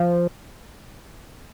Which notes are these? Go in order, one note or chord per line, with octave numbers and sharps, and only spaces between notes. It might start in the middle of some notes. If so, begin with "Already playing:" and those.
Already playing: F3